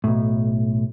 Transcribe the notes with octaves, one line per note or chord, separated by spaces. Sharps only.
B1 A2